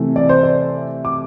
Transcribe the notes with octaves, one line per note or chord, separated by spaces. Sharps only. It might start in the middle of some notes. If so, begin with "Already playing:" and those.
Already playing: C3 E3 A3
D5
C5
D5
D6